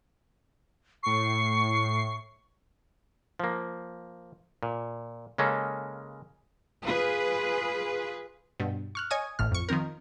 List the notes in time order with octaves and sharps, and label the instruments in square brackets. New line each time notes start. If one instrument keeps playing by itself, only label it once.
[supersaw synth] A2 C7 [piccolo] C#6
[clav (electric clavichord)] F3 A#3
A#2
C#3 G#3 A#3 C#4 A4
[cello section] F4 G#4 B4
[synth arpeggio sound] G2 B2
C#6 F6 F#6
C#5 D#5 G#5 C#6 D#6
A1 A2 F6
F2 C#6
D#3 F3 C4 A#4